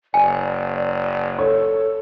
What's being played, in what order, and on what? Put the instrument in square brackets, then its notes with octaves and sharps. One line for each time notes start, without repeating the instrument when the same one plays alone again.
[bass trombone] F#1 [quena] D5 [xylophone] G#5
[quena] A4 [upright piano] C#5